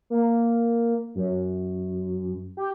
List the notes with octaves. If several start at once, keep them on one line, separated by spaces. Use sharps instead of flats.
A#3
F#2
G4